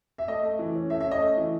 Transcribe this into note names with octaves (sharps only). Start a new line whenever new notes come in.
E5
A3 D#5
A3
E3
C#4
A3 E5
E5
C#4
D#5
A3
E3